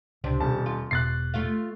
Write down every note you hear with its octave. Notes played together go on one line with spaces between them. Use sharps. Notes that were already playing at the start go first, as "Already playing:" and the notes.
C#2 C3 C4 D4
D#1 B2 A5
F4
E1 B2 F#6 A6 C7
A3 F4 F5